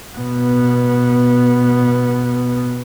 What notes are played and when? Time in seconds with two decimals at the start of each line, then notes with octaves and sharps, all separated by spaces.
0.16 B2 B3